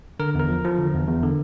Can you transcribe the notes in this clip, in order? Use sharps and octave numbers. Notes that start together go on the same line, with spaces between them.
D3 A#4
E2 A#4
F3
F3
D3
E2
E2
D3